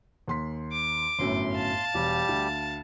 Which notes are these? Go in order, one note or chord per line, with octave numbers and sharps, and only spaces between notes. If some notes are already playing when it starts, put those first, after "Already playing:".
D#2 C6 B6
D6
G1 F#2 A2 C6
F5 A5
E1 G3 G4
D2